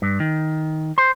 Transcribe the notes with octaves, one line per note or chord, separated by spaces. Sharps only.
G2
D#3
C5